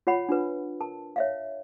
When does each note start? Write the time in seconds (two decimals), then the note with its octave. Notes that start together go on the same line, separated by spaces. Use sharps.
0.07 F4 C#5 F#5 B5
0.29 D4 F4 B4
0.80 A#4 A5
1.16 C#5 E5 F5